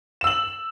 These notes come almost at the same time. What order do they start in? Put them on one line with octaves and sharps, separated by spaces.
E7 E6 F#7